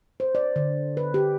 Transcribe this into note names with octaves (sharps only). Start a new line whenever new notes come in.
C5
D5
D3
B4
G4